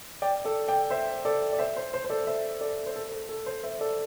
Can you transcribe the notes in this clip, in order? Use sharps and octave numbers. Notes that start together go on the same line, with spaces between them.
D5 G5
A4 D5
D5 G5
C5 E5
A4 D5
D5
C5 E5
C5
C5
C5
A4 D5
C5 E5
A4 D5
C5
A4
A4
A4
C5
C5 E5
A4 D5